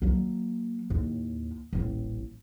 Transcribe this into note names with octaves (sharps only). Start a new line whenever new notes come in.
F#3 A#3
D#2 A2
D#1 A1